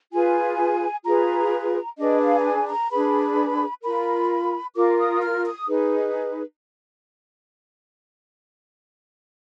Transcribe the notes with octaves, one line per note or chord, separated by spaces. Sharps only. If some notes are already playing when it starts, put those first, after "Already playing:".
F4 G#4 B4 G#5
F4 G#4 B4 A#5
D4 G#4 B4 D#5
F5
A#5
G#5
A#5
D4 G#4 B4 B5
F4 A#4 B5
F4 A#4 D6
D#6
F6
D#6
D#4 G#4 B4